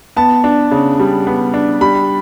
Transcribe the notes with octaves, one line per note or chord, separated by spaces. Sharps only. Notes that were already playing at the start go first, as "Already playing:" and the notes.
B3 A5
D4
C#3
G3
B3
D4
G3 B5